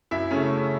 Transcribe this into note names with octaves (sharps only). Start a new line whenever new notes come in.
F#2 E4 E5
C#3 A3 C#4